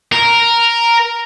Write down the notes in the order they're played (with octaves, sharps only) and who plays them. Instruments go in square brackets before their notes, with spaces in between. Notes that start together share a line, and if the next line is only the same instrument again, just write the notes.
[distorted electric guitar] A#4